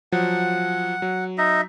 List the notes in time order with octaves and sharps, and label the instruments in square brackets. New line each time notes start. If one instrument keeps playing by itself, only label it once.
[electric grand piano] F3 F#3 [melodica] F#5
[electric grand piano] F#3
[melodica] D#4 D#5 E5